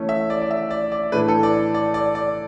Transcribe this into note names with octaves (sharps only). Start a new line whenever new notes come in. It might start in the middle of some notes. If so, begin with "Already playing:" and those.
Already playing: E3 A3 C#4
E5
D5
D5
E5
D5
D5
A2 E3 A3 D4 B4
A4
D5
D5
D5
D5